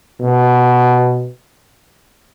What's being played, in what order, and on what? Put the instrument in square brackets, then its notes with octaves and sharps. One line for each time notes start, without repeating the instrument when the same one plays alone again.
[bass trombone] B2